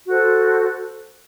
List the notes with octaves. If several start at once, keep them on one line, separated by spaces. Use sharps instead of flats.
F#4 A4 C5